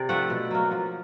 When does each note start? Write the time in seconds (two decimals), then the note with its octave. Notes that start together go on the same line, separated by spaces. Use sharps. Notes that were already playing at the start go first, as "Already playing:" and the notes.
Already playing: C3 D5
0.09 F3 A3 C4 E5 F#5
0.30 B2
0.51 F#3 A#3
0.71 F3